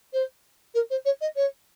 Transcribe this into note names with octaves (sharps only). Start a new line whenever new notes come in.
C5
A#4
C5
C#5
D#5
C#5